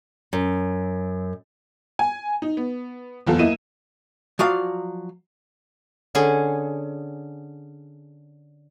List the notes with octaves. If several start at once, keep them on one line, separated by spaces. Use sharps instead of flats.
F#2
G#5
D#4
B3
F#1 E2 F4 A4
A#3 E4 D#5 D#7 E7
F3 F#3 D5 F5
D3 C#4 G#4